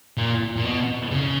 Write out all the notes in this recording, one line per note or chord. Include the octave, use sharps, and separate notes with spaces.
A#2
A#2
B2
C#3